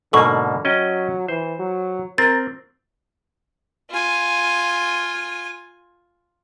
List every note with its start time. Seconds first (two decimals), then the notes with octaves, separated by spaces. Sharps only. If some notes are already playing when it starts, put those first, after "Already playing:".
0.13 G#2 B2 D3 A#3 A4 C#6
0.65 F#3 C#4 D#5 G5
1.28 E3 C5
1.59 F#3
2.18 C4 A#4 A6
3.91 F4 G#5